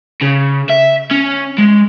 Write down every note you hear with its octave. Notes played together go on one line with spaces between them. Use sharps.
C#3
E5
C#4
G#3